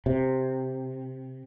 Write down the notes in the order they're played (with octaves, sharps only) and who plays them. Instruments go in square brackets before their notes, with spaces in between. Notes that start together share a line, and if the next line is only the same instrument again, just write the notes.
[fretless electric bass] C3